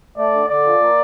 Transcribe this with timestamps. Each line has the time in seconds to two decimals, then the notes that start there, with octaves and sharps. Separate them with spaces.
0.17 A3 D5
0.32 D3
0.49 D3 D5
0.65 F3
0.81 A#3